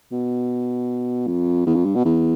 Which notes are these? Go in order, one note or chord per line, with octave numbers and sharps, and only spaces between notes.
B2
F2
E2
F2
G2
B2
E2